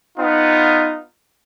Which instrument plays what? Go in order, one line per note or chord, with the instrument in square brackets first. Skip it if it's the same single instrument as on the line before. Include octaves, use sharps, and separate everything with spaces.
[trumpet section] B3 D#4 F4